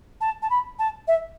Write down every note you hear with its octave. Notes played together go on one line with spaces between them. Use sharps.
A5
A5
B5
A5
E5